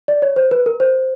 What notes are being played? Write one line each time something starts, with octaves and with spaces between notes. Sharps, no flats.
D5
C#5
C5
B4
A#4
C5